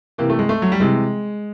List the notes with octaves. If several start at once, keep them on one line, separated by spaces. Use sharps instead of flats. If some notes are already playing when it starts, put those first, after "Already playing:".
C3 E3 A#3
A3
G#3
A3
F#3
G3
C3 E3 G#3